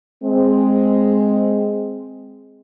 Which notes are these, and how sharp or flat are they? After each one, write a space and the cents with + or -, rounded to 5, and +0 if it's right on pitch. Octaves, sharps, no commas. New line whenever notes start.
G#3 +0 C4 +0